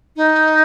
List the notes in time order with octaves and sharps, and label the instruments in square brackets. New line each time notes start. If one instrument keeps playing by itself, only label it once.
[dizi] D#4